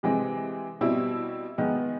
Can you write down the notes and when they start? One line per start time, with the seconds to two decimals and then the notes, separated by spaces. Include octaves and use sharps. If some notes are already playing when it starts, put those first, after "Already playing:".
0.03 C3 E3 G#3 C4
0.81 B2 G3 C4 E4
1.58 D#3 G#3 B3